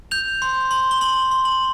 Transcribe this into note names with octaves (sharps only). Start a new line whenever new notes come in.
G6 F7
C6
C6
G7
C6 F#7
C6
F#7